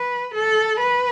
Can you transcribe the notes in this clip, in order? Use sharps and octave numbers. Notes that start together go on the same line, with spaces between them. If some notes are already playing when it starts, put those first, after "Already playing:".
Already playing: B4
A4
B4